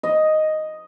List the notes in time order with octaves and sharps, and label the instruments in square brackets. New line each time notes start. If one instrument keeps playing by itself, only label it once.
[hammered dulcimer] D#5